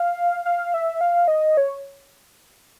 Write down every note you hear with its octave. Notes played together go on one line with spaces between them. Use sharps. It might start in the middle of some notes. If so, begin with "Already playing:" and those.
Already playing: F5
F5
E5
F5
D#5
C#5